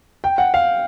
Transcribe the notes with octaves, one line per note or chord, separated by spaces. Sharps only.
G5
F#5
F5